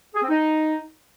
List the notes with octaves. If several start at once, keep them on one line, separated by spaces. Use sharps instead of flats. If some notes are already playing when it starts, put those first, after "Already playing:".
G#4
C4
D#4